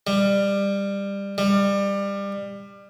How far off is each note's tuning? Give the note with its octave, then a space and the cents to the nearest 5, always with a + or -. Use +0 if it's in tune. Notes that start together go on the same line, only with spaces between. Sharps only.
G3 +20
G3 +25